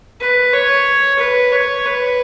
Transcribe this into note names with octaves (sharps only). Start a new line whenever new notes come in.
B4
C#5
B4
C#5
B4